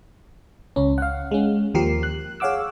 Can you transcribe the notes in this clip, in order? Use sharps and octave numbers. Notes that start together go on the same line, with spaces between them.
C#2 C#4
F5 F#5
G#3 C#4
D#2 F3 G4 A#4 C7
F#6
G#4 C#5 F5 F#5 D6 E6